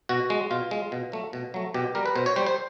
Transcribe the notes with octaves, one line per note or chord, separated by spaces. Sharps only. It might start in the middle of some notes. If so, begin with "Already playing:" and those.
B2 F#4
G#3
B2 F4
G#3
B2
F#3 A3
B2
F#3 A3
B2 G4
G3 A#4
B4
B2 C5
C#5
G3 C5
C5